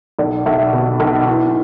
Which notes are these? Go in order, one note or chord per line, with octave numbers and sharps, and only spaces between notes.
B1 D5
B1 E5
B2
B1
E3